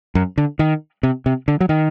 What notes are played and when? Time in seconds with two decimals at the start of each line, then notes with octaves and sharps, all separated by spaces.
0.15 F#2
0.38 D3
0.59 D#3
1.03 C3
1.26 C3
1.48 D3
1.60 F#3
1.69 D#3